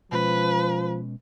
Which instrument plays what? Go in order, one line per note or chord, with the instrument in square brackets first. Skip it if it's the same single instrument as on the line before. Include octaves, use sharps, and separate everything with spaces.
[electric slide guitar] B2 G#3 C#4 [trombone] F3 [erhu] B4